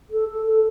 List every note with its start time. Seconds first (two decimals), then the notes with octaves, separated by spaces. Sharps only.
0.11 A4
0.28 A4
0.46 A4